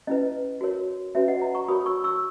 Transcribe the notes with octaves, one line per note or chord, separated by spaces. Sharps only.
C#4 E4 B4 D#5
F#4 A#4 C#5
C#4 F#4 B4 C#5 E5
D#5 F#5
F#5 A#5
A#5 C#6
F#4 A#4 C#5 B5 D#6
C#6 E6
C#6 E6